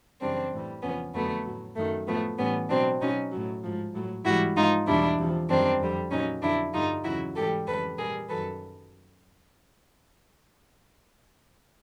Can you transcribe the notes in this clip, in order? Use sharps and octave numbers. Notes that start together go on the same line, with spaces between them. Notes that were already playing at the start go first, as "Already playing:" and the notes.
F#2 C#3 E3 G3 C4 D4
A2 E3 G3
E2 C3 F3 B3 C#4
F2 D3 F#3 A3 B3
A2 F#3
F#2 D#3 F#3 A3
A2 F3 A3 B3
A2 E3 G3 B3 C#4
B2 F#3 C4 D4
B2 F#3 C#4 D#4
A2 F#3
G#2 F3
A2 F#3
G#2 E3 G3 E4 F#4
G#2 F3 D#4 F4
E2 B2 G3 D4 E4
E2 C3 F3
F#2 D#3 G3 C4 D4
F2 D3 G3
A#2 F#3 C#4 D#4
F2 D3 F#3 D4 E4
G2 D3 G3 D#4 F4
E2 C#3 F#3 E4 F#4
G#2 E3 G3 G4 A4
F2 C#3 E3 G3 A4 B4
A#2 G3 G#4 A#4
F#2 D#3 F#3 A4 B4